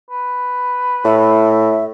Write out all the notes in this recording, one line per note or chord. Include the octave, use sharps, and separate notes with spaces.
B4
A2 E5